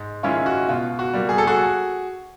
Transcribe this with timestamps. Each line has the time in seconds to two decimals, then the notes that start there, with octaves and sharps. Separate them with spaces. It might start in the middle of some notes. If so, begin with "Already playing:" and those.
Already playing: G#2
0.23 D#3 G#3 C#4 E4 F4
0.46 F#4
0.68 B2 F4
0.99 F#4
1.13 G3 A#3
1.29 G#4
1.38 A4
1.47 F#4 G#4